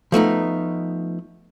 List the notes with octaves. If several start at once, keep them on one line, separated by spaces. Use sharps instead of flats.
F3 A3 B3 D#4